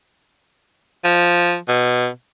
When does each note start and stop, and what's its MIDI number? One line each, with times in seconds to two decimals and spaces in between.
1.05 1.56 53
1.68 2.07 47